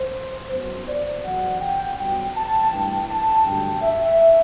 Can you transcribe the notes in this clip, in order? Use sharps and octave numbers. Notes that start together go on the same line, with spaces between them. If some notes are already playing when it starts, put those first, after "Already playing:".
Already playing: C5
F#2 F#3 B3 C5
D5
E2 B2 F#3 F#5
G5
G2 F#3 B3 G5
A5
G2 E3 A3 G5
A5
G2 D3 F#3 A3 G5
E5